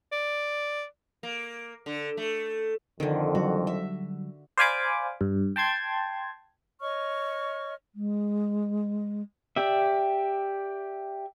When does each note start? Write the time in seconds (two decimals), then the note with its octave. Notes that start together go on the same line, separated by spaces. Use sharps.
0.12 D5
1.23 A#3
1.86 D3
2.17 A3
3.00 F2 D3 D#3
3.35 D3 F#3 G3 F#4
3.67 E5
4.58 C5 D5 F5 G#5 B5 D6
5.21 G2
5.56 G5 A5 C6 G#6
6.81 C#5 D#5 C#6 F6
7.93 G#3
9.56 G4 D5 E5